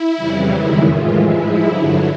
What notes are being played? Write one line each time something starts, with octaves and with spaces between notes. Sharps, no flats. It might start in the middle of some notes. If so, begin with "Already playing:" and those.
Already playing: E4
F2 C#3 E3 G3
F#2 D#3 G#3 E4
A2 E3 G#3 F4
G#2 F3 G#3 E4
G2 D3 F#3